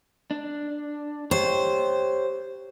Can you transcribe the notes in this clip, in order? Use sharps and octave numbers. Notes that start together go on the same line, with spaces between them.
D4
G4 C5 C#5